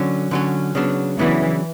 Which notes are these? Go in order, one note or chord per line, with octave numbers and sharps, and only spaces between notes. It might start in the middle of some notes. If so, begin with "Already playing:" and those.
Already playing: D3 F#3 C#4
D3 F#3 C#4
C#3 F#3 B3 D4
C#3 E3 F#3 B3 D4